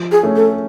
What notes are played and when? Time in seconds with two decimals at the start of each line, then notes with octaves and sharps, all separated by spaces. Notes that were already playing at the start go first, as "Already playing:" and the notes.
Already playing: F3
0.12 G#4
0.23 A3 C#4
0.36 A4